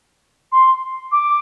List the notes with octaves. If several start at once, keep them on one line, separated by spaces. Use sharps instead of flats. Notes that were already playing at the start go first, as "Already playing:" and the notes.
C6
D6